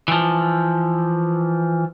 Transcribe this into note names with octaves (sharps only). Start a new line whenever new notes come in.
E3 F3